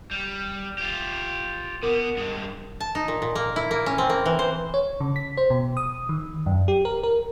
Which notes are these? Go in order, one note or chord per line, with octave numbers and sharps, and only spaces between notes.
G3
F4 G4
B2 B3 A#4 D6
G2 G#3
A5
D#4
A#2
A#2
A#3
E4
A#3
C#4
C4
A#3
E3
C5
C#5
C#3
B6
C5
B2
D#6
D#3
F#2
G4
A#4
A#4